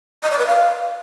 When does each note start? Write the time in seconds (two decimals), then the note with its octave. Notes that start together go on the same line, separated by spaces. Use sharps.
0.23 D#5
0.31 D5
0.39 B4
0.47 F5